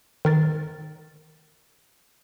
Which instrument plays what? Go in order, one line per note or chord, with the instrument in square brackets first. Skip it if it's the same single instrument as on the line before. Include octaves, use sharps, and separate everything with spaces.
[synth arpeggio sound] D#3 A#4 A6